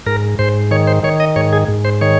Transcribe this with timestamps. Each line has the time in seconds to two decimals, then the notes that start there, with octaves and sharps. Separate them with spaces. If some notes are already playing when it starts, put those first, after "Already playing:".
0.06 G#2 A#4
0.39 G#2 C5
0.71 D#3 C#5
0.87 C5
1.03 D#3 C#5
1.20 D#5
1.36 G#2 C#5
1.53 G#4
1.68 G#2
1.85 C5
2.01 D#3 C#5